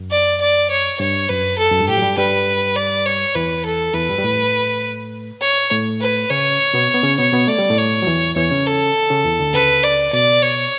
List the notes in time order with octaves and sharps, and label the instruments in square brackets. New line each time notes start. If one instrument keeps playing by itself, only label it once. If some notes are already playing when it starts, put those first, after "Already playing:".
Already playing: [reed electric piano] F#2
[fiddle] D5
D5
C#5
[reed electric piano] G2 [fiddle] C#5
[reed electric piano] F#2 [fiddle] B4
[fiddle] A4
[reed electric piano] F#2
G2
[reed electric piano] A2 [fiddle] G4
[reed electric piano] F#3
G2 G3
[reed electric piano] G2 G3 [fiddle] B4
[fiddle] D5
C#5
[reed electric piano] E2 E3 [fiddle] B4
[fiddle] A4
[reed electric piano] E2 E3 [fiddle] B4
[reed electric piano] G2 G3
G3
A2 A3
[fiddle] C#5
[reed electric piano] A2 A3
[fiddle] B4
[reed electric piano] C#3 C#4 [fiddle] C#5
[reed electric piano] B2 B3
B3
C#3 C#4
[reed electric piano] B2 B3 [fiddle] C#5
[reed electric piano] B2 B3
[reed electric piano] A3 [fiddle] D5
[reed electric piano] G3
A2 A3
[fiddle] C#5
[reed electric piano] F#3
E2 E3
[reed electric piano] E2 E3 [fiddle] C#5
[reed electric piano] C#3 C#4
[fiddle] A4
[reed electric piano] C#3 C#4
E2 E3
D2 D3
[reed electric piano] C#2 C#3 [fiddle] B4
[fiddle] D5
[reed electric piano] B2 [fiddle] D5
[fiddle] C#5